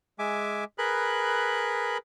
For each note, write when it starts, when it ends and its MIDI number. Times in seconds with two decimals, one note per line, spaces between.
0.19 0.64 56
0.19 0.64 76
0.19 0.64 80
0.19 0.64 86
0.78 1.98 68
0.78 1.98 70
0.78 1.98 71
0.78 1.98 83
0.78 1.98 90